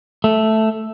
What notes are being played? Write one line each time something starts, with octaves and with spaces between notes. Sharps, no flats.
A3